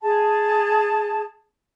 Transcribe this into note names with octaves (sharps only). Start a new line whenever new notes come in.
G#4 A5